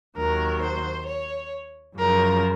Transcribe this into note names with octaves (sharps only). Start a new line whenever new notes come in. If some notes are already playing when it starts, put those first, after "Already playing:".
D#2 D#3 F#3 A#4
C5
C#5
F#2 C#3 F3 A#4